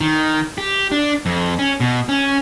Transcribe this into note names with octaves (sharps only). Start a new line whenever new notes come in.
D#3
G4
D4
F2
C#4
B2
C#4